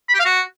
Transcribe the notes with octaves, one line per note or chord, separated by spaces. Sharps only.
B5
G4
F5
F#4